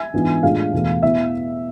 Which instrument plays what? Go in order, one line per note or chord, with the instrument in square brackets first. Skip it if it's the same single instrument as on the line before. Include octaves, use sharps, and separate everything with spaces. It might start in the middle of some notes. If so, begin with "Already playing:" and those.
Already playing: [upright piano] E5 G#5
G#2 E3 B3 D4 F4
A2 G#3 D4 F4 F5
E2 B2 A3
B2 B3 E4 E5